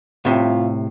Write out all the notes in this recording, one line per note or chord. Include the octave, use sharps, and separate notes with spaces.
A2 C3 F4